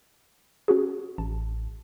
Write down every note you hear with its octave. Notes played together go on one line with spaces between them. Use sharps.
C#4 F#4 G#4
A1 A5